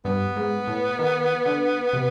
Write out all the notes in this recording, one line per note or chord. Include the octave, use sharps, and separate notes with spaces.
G2 B3
G#2
A2
D#3
D3
C3